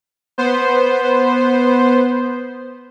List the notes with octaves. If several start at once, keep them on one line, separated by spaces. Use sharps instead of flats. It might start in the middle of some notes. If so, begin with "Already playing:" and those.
B3 C5